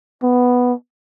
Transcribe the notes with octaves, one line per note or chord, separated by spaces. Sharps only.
B3